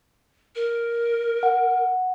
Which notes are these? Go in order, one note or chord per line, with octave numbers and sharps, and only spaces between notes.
A#4
F#5